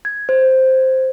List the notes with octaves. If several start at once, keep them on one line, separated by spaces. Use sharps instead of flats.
G#6
C5